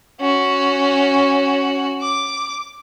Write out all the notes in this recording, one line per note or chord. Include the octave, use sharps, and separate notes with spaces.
C#4 F#4
D6